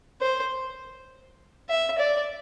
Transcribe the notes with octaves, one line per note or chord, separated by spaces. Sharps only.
C5
E5
D5